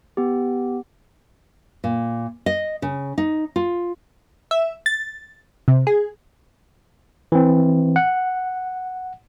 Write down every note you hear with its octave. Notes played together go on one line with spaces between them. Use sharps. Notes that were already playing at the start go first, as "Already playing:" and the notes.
B3 G4
A#2
D#5
C#3
D#4
F4
E5
A6
C3
G#4
E3 C4
F#5